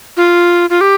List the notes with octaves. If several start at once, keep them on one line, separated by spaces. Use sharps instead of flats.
F4
F4
G4